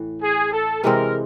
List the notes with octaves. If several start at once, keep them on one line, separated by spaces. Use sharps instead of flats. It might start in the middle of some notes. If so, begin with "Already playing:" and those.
Already playing: A2 E3
G#4
A4
C3 E3 G#3 C4 A#4